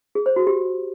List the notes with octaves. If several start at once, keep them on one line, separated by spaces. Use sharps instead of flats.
G#4
C5
F#4
G4